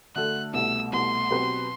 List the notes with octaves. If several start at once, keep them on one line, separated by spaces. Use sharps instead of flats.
D3 A3 D4 F#4 A4 F#6
C2 B2 A3 E6
C2 B2 A3 C6
B2 F#3 C4 G4 B4